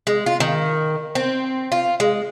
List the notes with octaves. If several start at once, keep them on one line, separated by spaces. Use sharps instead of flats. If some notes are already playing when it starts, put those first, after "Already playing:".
G#3
F4
D#3
C4
F4
G#3